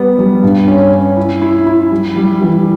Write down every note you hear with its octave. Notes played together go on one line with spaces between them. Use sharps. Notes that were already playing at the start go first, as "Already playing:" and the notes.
Already playing: G3 B3
G3
G2
C#4
C#4
E4
E4
E4
G3
G3
E3